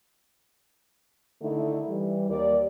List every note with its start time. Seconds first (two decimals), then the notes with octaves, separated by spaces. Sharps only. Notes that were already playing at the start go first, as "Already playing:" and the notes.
1.42 D3 D#3 A3 D#4 E4
1.89 E3 G3
2.30 D#2 D#4 A#4 D5